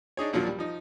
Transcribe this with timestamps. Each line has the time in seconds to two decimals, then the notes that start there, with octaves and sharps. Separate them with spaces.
0.17 D4 D#4 G#4 C#5
0.33 D#2 A#2 F3 F#3 D4
0.47 G3
0.58 F3 D#4